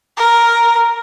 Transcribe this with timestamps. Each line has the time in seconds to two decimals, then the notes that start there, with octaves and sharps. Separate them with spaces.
0.17 A#4